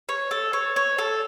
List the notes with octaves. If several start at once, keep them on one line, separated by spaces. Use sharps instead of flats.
C#5
A4
C#5
C#5
A4